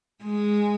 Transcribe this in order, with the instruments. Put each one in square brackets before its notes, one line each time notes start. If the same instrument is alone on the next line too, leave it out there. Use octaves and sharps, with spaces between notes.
[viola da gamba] G#3